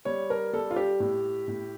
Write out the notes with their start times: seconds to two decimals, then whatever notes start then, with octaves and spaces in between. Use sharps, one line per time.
0.05 G3 C#5
0.30 A#4
0.53 G3 A4
0.71 F4
0.76 G4
1.00 A2
1.48 A2